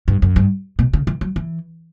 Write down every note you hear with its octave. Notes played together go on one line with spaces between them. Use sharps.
G2
F#2
G2
B2
C#3
E3
F#3
E3